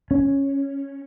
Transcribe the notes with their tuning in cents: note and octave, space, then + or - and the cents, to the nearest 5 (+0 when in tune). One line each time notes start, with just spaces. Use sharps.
C#4 -5